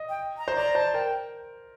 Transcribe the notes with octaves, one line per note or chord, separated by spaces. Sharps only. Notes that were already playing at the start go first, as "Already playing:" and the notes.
Already playing: D#5
G5
A#5
C5
D5 A#5
C5 A5
A#4 G5